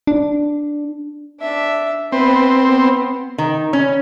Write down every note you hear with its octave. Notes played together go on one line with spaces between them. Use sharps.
D4
D4 E5
B3 C4 B4
B3
D#3
C#4